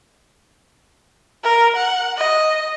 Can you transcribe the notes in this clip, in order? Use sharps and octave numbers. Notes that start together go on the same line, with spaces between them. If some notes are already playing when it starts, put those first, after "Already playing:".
A#4
F#5
D#5